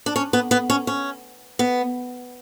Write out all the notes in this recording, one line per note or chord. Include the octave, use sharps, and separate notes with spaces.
D4
C#4
B3
B3
C#4
C#4
B3